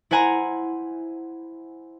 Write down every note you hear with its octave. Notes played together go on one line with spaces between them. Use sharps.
E4 C5 F#5 G#5 A#5